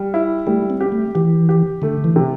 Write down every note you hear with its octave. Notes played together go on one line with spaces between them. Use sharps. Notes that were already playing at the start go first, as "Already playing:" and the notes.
Already playing: G3
E4
G3 A3
C4
G4
A3
E3 G4
G4
D3 A3
E3
C3